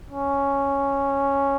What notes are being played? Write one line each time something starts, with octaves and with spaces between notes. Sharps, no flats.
C#4